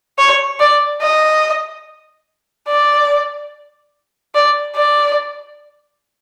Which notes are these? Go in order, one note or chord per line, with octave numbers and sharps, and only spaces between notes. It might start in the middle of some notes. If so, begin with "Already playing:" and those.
C#5
D5
D#5
D5
D5
D5